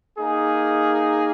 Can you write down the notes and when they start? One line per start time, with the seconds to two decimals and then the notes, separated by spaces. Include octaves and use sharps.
0.18 A#3 D#4 G#4